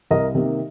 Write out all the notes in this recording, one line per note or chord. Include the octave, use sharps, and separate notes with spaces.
C2 A#4 D#5
C3 D#3 A#3